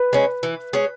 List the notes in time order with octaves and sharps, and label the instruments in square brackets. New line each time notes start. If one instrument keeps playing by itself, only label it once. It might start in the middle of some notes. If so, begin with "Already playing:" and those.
Already playing: [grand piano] B4
[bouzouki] G#3 C#4
E3
G#3 C#4